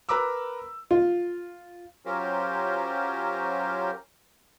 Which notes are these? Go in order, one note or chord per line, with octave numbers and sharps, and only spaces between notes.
A#4 B4 A#5 B5 D6 E6
F4
F#3 C#4 F4 G4 A#4 C5